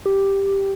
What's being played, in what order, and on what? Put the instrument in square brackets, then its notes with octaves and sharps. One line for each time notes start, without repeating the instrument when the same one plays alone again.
[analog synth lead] G4